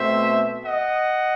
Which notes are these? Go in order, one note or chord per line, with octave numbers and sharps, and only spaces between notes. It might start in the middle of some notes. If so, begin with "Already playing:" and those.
Already playing: B2 A3 C4 C5 E5
D#5 F#5